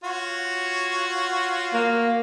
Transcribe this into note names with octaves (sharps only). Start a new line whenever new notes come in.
F4 F#4 C#5
A#3